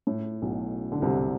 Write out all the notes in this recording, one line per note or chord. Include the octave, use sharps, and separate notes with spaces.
A2
B1 B2
D3
C2 C3